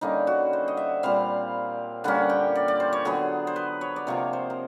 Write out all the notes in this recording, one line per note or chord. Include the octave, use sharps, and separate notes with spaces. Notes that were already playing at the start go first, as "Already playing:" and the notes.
D3 G3 A#3 C#4 D#4
F#4
C5
D#5
E5
A#2 G3 C4 F5
D3 G3 A#3 C#4 F#5
G5
D5
D5
C5
C#5
D3 F#3 B3 G#4
C5
B4
C#5
D5
C3 F3 A#3 C#5
C5
A#4